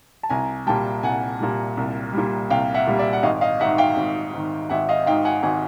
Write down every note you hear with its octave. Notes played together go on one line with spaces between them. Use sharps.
A5
C2 G#5 A#5
A#2 G3 G5 A5
C2 F#5 G#5
A#2 G3
C2
A#2 G3
C2 F5 G5
E5 F#5
A#2 G3
D5 E5
F#5
G#1 D#5 F5
D#5 F5
G#2 D#3 E5 F#5
F5 G5
G#1
G#2 D#3
G#1 E5 F#5
D#5 F5
G#2 D#3 F5 G5
F#5 G#5
G#1 F#5 G#5